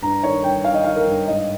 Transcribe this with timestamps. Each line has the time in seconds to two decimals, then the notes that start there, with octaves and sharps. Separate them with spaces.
0.02 G2 A#5
0.23 D#3 C#5
0.44 G2 G5
0.64 D#3 F5
0.74 D#5
0.84 D#3 F5
0.96 A#4
1.07 G2
1.27 G#2 D#5